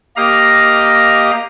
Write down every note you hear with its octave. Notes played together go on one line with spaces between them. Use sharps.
A#3 G4 D#5 F5 A#5